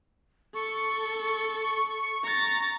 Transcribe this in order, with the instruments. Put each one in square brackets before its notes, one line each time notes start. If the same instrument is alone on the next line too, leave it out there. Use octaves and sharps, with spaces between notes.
[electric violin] A4 [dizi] C#6
[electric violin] A#5 A6